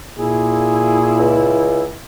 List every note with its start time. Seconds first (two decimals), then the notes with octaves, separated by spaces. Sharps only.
0.18 A#2 E4 G#4
1.19 C#2